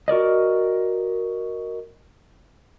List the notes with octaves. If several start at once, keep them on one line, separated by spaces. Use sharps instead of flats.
F#4 A#4 D5 D#5